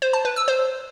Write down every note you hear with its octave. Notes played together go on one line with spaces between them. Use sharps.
C5
A5
B4
E6
C5